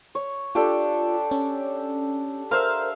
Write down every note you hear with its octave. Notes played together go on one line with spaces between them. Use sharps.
C#5
D4 F4 G4 A4
C#4
A#4 C5 E5 F5